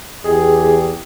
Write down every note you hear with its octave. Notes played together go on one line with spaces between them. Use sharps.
E2 G4 G#4